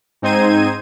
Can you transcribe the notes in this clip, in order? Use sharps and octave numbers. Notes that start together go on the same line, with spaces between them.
G#2 C4 D#4 C5 G#6 D#7